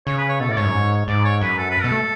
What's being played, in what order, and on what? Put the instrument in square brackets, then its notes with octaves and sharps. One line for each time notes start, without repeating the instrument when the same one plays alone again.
[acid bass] C#3 [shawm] C#5
[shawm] B4
C#5
[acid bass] B2 [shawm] A4
[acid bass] A2 [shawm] D5
[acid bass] G#2 [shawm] C#5
[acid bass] F#2
G#2
[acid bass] G#2 [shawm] D5
[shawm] C#5
[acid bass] F#2 [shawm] B4
[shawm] A4
B4
[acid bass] B2 [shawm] A4
[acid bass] A3